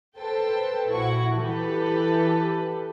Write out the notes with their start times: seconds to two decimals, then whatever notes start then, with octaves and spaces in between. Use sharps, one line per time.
0.18 A4 B4 C5 G5 A5
0.88 A#1 E4 F#4 C#6
1.33 E3 G4 A4 B4